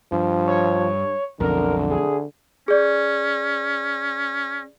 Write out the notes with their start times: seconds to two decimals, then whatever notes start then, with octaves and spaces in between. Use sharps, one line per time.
0.12 G2 F3
0.47 C#5
1.40 B1 F2 D3 A#4
1.90 G#4
2.68 C#4 G#4 D5